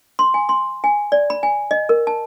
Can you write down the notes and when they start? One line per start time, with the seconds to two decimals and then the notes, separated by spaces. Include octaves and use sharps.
0.19 C6
0.34 G#5
0.49 C6
0.84 G#5
1.12 D5
1.30 B5
1.43 G#5
1.71 D#5
1.89 A#4
2.07 A5